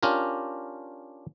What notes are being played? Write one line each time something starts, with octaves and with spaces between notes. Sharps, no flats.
C#4 D4 F4 G4 A#4